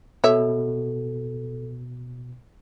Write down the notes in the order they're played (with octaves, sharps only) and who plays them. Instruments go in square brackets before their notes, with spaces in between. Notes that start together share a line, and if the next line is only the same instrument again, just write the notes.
[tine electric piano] B2 [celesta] A4 [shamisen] C#5 E5